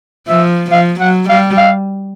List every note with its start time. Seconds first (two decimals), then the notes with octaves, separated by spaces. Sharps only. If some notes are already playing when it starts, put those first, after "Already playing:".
0.28 F3 E5
0.71 F3 F5
1.00 F#3 F#5
1.29 G3 F5
1.57 F5